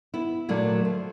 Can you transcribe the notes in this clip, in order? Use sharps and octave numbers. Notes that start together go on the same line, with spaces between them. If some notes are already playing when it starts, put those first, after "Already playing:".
B3 E4
A#2 D3 F#3 A3 A#3
F3